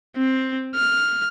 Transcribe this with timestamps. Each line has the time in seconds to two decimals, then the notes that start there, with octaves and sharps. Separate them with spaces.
0.17 C4
0.75 F6